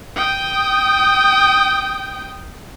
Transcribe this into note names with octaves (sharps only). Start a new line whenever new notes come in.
G5 D#6